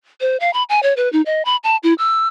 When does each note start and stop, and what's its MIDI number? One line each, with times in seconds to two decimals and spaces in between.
0.21 0.37 72
0.40 0.52 77
0.54 0.63 83
0.69 0.80 80
0.83 0.94 73
0.97 1.11 71
1.13 1.22 63
1.26 1.42 75
1.45 1.56 83
1.64 1.77 81
1.83 1.94 64
1.98 2.28 88